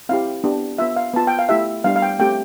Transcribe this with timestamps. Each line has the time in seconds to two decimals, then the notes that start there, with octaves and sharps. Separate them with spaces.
0.09 C4 E4 G4 F5
0.44 B3 D4 G4
0.78 B3 F4 E5
0.96 F5
1.14 B3 F4 A5
1.27 G5
1.39 F5
1.49 A3 E4 G4 E5
1.84 G3 B3 D4 G4 F5
1.96 F5
2.02 G5
2.19 A3 C4 G4 G5